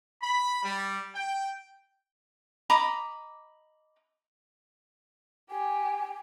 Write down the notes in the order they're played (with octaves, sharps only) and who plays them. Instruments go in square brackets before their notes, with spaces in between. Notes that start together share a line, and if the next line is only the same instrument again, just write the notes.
[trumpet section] B5
G3
G5
[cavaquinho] D#5 A#5 B5 D6
[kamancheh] G4 [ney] G#5